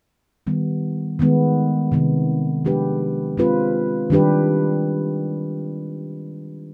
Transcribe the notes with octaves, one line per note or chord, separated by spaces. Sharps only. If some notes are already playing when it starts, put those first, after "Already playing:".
D#3 G3 B3
D#3 G#3 B3
C3 D#3 B3
F3 G#3 D4 G4 B4
G#3 C4 F4 B4
D#3 G3 D4 G4 B4